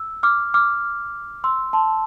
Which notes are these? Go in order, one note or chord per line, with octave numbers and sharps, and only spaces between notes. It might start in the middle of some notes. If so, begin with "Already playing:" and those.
Already playing: E6
D6 F6
D6 F6
C6 E6
A5 C6